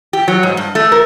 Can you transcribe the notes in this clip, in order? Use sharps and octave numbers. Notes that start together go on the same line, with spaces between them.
G4
F#3
G#2
G2
A3
A#4